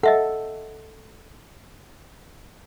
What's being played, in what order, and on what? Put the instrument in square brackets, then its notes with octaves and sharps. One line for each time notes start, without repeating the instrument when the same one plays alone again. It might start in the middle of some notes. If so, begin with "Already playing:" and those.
[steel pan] A4 [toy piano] D#5 E5 F#5